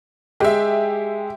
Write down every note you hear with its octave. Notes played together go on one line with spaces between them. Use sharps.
G#3 G4 E5